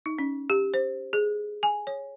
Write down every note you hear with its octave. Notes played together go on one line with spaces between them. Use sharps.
D#4
C#4
G4
C5
G#4
G#5
C#5